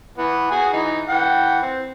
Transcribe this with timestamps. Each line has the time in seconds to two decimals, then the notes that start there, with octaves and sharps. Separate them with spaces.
0.18 E3 B3
0.51 F#4 G#4 G#5
0.73 E3 D#4
1.09 E3 F#5 G5
1.62 C4